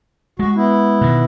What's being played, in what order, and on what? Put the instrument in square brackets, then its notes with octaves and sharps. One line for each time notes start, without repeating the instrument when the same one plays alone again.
[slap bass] G#3 [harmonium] F#4
[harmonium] B3 E4
[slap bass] B2 D#3